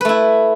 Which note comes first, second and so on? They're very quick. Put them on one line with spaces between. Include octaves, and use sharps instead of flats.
B4 A3 E4